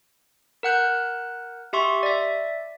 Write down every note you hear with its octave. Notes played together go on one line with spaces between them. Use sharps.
A#4 F#5 F#6 G6
G4 E5 C6 C#6
D5 E5